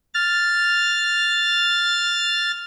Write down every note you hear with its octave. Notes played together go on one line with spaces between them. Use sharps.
F6 A6